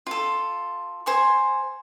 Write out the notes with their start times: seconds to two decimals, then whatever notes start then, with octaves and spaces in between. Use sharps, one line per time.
0.07 F4 A4
1.06 C5 G#5 C#6